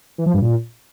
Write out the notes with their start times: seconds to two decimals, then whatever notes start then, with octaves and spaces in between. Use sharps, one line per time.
0.18 E3
0.26 F3
0.34 G2
0.42 A#2